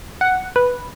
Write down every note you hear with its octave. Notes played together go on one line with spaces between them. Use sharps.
F#5
B4